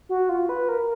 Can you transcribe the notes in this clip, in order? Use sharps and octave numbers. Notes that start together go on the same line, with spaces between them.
F#4
F4
B4
A#4